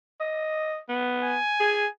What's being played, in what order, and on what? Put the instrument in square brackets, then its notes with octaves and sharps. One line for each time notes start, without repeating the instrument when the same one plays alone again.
[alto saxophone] D#5
B3
[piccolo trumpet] G#5
[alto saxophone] G#4